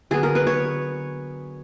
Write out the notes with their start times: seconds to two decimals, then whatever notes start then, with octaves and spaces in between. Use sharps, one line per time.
0.11 D3 F#3 B3 G#4
0.23 A#4
0.35 B4
0.47 C#5